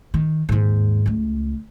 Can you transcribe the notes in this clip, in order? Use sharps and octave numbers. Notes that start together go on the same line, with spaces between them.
D#3
D#2 G#2
C#2 A3